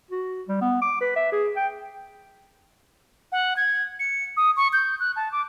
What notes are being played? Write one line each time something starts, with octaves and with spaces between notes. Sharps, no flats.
F#4
G3
B3
D6
B4
E5
G#4
G5
F#5
G#6
C#7
D#6
C#6
G6
F#6
A5
D6